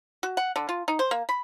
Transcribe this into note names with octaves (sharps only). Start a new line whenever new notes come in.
F#4
F#5
D3
F4
D#4
C5
A#3
B5